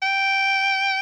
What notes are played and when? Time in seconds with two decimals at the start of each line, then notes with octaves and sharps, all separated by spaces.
0.02 G5